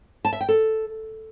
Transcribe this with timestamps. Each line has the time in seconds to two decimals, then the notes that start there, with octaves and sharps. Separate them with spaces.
0.25 A5
0.33 E5
0.41 G5
0.49 A4